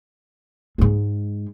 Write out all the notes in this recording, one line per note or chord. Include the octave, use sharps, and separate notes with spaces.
G#2 G#3